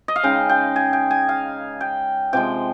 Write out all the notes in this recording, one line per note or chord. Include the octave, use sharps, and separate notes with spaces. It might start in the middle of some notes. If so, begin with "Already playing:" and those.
D#5
F5
C#3 G#3 D#4 G5
G5
G#5
G5
G#5
F5
G5
C3 F3 G#3 G5